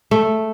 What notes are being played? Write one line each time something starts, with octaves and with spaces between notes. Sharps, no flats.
A3